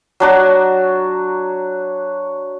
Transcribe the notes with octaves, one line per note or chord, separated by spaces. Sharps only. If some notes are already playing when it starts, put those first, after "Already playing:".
F#3 D4 F#4